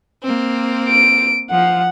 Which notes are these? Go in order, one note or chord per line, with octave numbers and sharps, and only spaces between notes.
A#3 C4
D7
F3 F#5